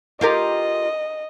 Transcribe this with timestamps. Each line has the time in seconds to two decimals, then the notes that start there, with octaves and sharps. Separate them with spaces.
0.21 F4 G4 A#4 D#5